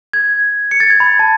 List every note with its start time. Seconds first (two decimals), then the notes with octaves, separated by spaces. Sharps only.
0.13 G#6
0.71 C#7
0.80 A6
0.90 G#6
1.00 B5
1.19 A5